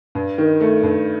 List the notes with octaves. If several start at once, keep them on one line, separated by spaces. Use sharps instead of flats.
G2
D#3
A3
G2